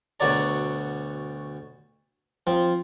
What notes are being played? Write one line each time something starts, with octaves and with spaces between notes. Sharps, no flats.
D2 B2 F#4 C#5 D5 A#5
F3 C4